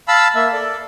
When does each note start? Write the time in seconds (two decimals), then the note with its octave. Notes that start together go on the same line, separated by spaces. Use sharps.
0.08 F5 A5 B5 E6
0.35 A#3 E5
0.52 A4 D5